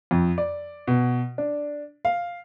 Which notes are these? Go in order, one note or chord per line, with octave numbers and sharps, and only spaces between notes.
F2
D5
B2
D4
F5